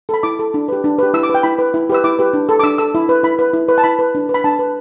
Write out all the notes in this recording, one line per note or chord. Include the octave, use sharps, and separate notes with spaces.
A4 B5
E4 D6
A4
D4
G4 B4
D4
G4 B4
E4 E6
D6
B4
G5
E4 B5
B4
E4
G4 B4 E6
E4 D6
G4 B4
D4
A4
D6
D4 E6
A4 E6
E4
B4
E4 B5
B4
E4
B4
A5
E4 B5
B4
D4
B4
B5
D4 A5
B4